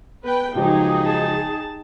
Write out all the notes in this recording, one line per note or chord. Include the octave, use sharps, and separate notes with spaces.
B3 B4 G5
C#2 F3 F#3 D#4 G4 G#4
A5